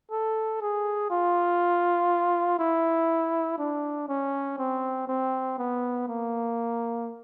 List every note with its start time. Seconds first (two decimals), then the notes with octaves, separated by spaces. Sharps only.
0.11 A4
0.61 G#4
1.10 F4
2.59 E4
3.59 D4
4.09 C#4
4.58 C4
5.08 C4
5.58 B3
6.08 A#3